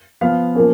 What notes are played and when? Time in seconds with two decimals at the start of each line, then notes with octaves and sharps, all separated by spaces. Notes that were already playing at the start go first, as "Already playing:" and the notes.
0.21 F3 B3 F5
0.55 A#2 F3 A#3 C#4